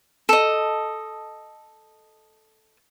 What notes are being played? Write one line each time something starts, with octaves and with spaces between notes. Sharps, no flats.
A4 D#5